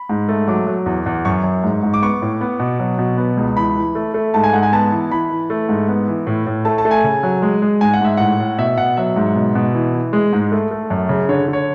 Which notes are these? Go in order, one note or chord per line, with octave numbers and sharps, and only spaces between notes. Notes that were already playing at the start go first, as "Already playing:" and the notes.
Already playing: B5
G#2
A3
F#3 D6
F#3
E2
E2
F#2 C#6
F#2
G#2
G#2
D6
B3 C#6
A2
B3
B2
F#3
B2
B3
C#2
E3 B5
E3
A3
A3
G#2 A5
G#5
G#2 F#5
G#5
B3 A5
E3
E3 B5
E3
A3
G#2
B3
E3
A2
A2
A3 A5
A5
A3
G#5
C#3
F#3
G#3
G#3
G#2 G#5
F#5
G#2 E5
A2 F#5
A2
B2 E5
B2 F#5
F#3 E5
G#2
B2
B2
E3
E3
G#3
G#2
A3
A3
F#2
C#3
D3 C#5
D3
C#5